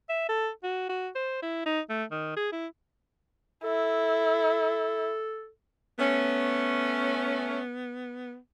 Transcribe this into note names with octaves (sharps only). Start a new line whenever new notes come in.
E5
A4
F#4
F#4
C5
E4
D#4
A3
D#3
G#4
E4
E4 A4
A3 B3 C#4